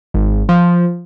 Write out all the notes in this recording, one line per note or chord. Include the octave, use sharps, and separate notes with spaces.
G#1
F3